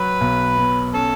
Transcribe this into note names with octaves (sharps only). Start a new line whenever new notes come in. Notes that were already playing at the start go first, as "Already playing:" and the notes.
Already playing: F#3 B4
B1
B2
C#4 A4